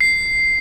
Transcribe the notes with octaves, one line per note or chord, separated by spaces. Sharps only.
C7